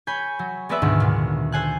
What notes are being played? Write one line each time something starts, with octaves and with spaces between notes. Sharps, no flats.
C#5 G#5 B5 G6
F#3
G#3 B3 C4 B4 D5 E5
D2 G#2 B2 D#3
A#2 B3
A4 C5 G#5 F#6